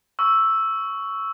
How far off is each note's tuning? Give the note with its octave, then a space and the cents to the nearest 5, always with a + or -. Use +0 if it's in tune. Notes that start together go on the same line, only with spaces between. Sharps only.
C#6 +10 E6 +0